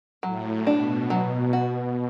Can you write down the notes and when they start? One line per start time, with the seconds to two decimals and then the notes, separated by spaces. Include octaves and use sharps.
0.23 A2 F#3
0.67 B2 D4
1.10 F#3
1.53 F#4